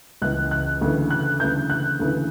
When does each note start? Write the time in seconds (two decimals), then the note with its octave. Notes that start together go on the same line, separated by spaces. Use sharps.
0.22 C#2 C#3 E3 F#6
0.51 F#6
0.81 D2 C#3 E3
1.11 F#6
1.40 D2 C#3 E3 G6
1.70 F#6
2.00 D2 C#3 E3